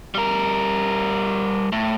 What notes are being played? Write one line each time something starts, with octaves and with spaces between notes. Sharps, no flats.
G3 A#4
A2